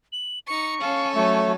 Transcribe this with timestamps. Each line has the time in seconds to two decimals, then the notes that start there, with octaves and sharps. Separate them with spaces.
0.12 F#7
0.47 D#4 C#6 C#7
0.81 C#4 A4 F5
1.15 F#3 A3 C#5